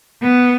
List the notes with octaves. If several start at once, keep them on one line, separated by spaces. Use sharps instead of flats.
B3